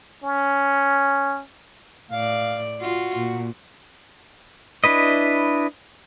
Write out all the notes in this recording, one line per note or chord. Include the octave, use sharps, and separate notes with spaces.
C#4
A2 D5 F5
F4 F#4
A#2
D4 E4 B4 D#5